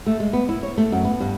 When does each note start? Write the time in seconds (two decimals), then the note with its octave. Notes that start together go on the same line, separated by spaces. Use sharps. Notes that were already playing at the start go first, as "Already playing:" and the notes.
0.06 A3
0.20 G#3
0.33 B3
0.49 E4
0.63 C#5
0.78 A3
0.92 F#2
1.04 B3
1.20 G2